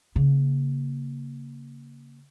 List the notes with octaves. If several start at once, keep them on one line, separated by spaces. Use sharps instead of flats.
C#3 A#3